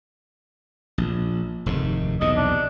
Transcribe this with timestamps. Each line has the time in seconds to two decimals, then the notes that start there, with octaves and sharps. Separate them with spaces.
0.98 A#1
1.66 F1 D#2 G#2
2.21 B1 E2 C3 D#5
2.36 D4